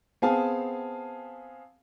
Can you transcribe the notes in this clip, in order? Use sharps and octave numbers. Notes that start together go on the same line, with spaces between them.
B3 C4 G#4 F5 G#5 A5